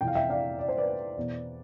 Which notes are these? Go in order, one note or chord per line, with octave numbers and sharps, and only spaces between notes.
F2 C3 E3 G5
F5
E5 G5
D5 F5
D5
C5
B4 D5
E2 B2